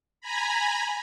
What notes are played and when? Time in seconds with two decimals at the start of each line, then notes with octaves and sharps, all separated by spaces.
0.21 G#5 A#5 B5